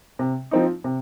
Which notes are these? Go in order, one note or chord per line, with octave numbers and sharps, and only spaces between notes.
C3
F3 C4 D#4
C3